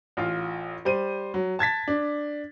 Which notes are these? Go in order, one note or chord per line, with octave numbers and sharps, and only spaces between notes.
A1 F4
G3 C5 D#7
F#3
A5 G#6 A6 B6
D4